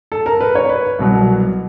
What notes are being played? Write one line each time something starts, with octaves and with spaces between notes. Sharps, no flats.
A4
A#4
B4
C#5
B4
C2 B2 F#3